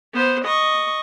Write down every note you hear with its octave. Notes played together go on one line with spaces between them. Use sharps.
B3 C5
D#5 C#6